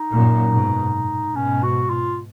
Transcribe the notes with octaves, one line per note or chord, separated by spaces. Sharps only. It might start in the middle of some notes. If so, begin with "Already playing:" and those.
Already playing: D#4
F#2 A#2
G#2 B2
G#2 B2 C#4
F#4
F4